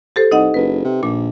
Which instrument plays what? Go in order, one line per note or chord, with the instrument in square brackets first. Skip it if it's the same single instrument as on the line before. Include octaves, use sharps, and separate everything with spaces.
[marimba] G4 A4 C5
[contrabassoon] C2 [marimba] D#4 D#5 F#5
[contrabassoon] F#1 [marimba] B4
[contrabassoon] C3
[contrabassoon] A#1 [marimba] A#2 D6